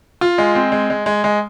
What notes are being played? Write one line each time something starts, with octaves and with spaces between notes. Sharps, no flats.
F4
G#3
C4
G#3
G#3
G#3
G#3